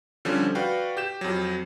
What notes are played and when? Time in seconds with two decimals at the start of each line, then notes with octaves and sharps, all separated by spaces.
0.25 D3 F3 G3 C#4
0.55 F#4 B4 D5 F5 G5
0.97 G4 G6 E7
1.21 F2 F#3